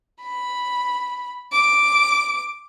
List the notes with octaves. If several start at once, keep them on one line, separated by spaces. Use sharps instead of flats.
B5
D6